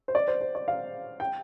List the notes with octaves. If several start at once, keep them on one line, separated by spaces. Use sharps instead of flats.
C5
D5
C5
C5
D5
F5
G5